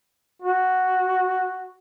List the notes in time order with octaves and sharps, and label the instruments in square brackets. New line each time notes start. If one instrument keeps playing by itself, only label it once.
[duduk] F#4